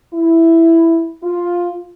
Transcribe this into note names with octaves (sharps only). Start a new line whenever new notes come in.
E4
F4